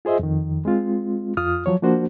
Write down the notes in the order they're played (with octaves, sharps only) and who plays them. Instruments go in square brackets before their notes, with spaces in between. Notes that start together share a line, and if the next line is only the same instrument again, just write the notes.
[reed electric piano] F4 G#4 C5 D#5 E5
F2 D#3
G#3 C4 F4
F2 F4 D#6 F6
F3 F#3 C#5
F3 A#3 D4 F#4 C5